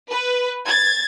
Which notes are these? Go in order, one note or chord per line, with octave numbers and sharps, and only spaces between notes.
B4
G#6 A6